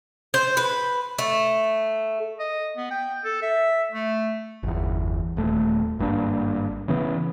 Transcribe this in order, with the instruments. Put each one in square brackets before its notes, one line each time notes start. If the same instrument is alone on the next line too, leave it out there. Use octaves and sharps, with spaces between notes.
[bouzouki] C5
B4
A3
[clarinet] D#5
B3
G5
A4
E5
A3
[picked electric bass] G1 E2
D#1 A3
G#1 G2 A#3 D4
C#3 E3 B3